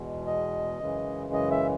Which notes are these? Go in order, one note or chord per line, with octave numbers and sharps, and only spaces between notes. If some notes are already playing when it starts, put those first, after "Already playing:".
Already playing: E2 B2 G#3
D#5
F#2 C#3 E3 G#3
D#5
E5